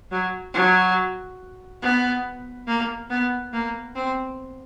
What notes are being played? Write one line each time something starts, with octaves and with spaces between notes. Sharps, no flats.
F#3
F#3
B3
A#3
B3
A#3
C4